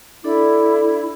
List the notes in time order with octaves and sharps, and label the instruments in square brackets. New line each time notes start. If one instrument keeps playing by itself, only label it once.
[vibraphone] D4 A4 D5 [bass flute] E4